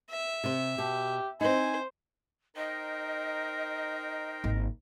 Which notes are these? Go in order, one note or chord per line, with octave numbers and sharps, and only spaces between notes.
E5
C3 C5
B2 G4
C4 D#4 C5 G#5
D#4 A#4 C5 D#5 G5
G#1 A#3